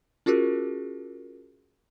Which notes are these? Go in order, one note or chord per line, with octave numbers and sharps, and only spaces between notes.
C#4 F4 F#4 G#4 A#4